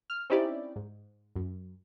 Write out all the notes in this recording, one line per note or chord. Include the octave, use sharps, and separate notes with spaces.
F6
C4 C#4 D#4 E4 G4 D5
G#2
F#2